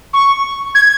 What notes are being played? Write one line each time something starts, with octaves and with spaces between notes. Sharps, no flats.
C#6
G#6